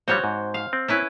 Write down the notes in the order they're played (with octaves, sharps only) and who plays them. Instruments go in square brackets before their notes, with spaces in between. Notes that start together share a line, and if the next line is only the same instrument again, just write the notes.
[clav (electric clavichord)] G2 F3 G3 [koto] C4 F#4 C#5
[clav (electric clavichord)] G#2
[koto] F5
[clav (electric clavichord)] C4
[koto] C#4 E4 B4